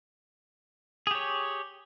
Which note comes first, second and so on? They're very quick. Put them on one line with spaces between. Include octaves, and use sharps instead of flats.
G#4 G4 C#5